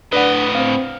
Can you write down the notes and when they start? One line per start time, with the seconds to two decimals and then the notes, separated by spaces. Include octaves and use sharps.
0.13 A2 D4 B4 D5 D#5 F#5
0.55 C4 F5